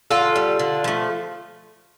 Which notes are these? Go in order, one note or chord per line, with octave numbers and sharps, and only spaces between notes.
D3 F4 A4
G3
D3
F3 A3